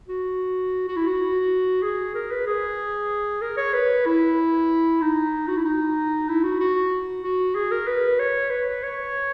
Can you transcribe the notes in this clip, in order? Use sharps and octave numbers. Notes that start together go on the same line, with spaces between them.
F#4
F#4
E4
F#4
G#4
A#4
B4
G#4
A#4
C#5
B4
E4
D#4
F#4
E4
D#4
E4
F#4
F#4
F#4
G#4
A#4
B4
C#5
B4
C#5